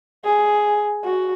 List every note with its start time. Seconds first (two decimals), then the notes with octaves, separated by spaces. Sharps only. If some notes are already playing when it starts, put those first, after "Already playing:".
0.25 G#4
1.04 F#4